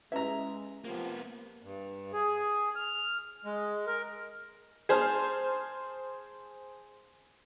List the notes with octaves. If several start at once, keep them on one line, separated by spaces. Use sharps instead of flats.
G#3 C#4 B4 E5 A#5
C3 F3 A#3 B3
G2
G#4
F6
G#3
A#4
G#4 C5 A5 F6